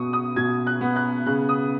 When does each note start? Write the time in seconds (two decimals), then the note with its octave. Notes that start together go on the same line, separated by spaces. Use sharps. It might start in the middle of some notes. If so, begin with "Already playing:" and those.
Already playing: B2 B3 C#6 D#6
0.13 D#6
0.36 B2 G#6
0.67 F#6
0.81 B3
0.96 F#6
1.26 C#3 F#6
1.49 D#6